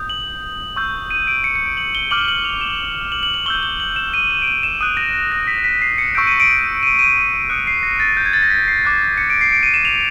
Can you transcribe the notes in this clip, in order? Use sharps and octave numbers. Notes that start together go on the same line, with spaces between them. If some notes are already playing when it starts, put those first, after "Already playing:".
Already playing: D#6 G6
F#7
C#6 E6 G6
D#7
D7
C#7
C#7
D7
F#7
G7
D6 F6 F#7
F#7
F7
E7
F#7
F#7
F#7
C#6 E6 G6 G7
G7
F#7
E7
D#7
D#7
D7
D#7
E7
D#6 F#6 D#7
A#6
A#6
A#6
B6
B6
C7
C#7
C#6 E6 G6 D7
D#7
D7
D#7
D#7
D#6 F#6 C#7
C7
A#6
A6
G6
G#6
A6
A#6
B6
C7
D6 F#6
C#7
D7
C7
D7
D#7
E7
F7